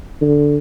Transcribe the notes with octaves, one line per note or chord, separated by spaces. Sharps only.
D3